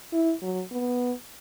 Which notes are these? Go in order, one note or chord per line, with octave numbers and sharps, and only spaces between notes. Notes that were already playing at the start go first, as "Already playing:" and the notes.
E4
F#3
B3